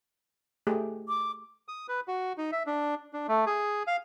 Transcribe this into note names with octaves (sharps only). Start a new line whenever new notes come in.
A3 G4 G#4
D6
D#6
B4
F#4
D#4
E5
D4
D4
A3
G#4
F5